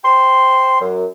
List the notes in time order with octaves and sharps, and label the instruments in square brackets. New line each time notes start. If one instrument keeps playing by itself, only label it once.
[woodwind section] C5 G5 C6
F#2